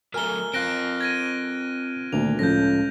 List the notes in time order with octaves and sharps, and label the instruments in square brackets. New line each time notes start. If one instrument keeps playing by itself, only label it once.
[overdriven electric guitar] F#3 A3 [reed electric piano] A#4 G#5 A#5 [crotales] F6 G7
[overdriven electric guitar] C4 F4 [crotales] F#6 A#6 D7
[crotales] G#6 A#6 D#7
[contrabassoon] D2 [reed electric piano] A#2 D#3 A#3 [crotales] F7
[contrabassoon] C#2 [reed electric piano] A2 F3 A4 [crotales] G6 A#6